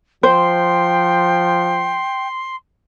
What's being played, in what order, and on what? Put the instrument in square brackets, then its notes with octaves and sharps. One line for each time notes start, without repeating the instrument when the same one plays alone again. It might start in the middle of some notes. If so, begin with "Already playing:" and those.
[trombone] F3 [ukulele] C5 [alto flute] G5 [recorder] C6